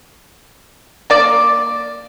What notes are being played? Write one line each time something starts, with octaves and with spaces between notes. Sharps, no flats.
A#3 D5